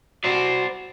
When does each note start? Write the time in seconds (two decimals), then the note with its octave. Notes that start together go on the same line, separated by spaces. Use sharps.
0.24 F#4 C5 D5